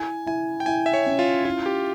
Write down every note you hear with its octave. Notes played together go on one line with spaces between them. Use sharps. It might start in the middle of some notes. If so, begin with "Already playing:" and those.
Already playing: E4 G#5
E4 G#5
G5
E4 G#5
E5
C#5
C#4
F4
E4 F4
G4